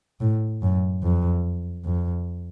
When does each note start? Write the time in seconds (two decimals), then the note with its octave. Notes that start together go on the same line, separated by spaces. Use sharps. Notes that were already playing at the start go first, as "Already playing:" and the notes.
0.20 A2
0.62 F#2
1.03 F2
1.85 F2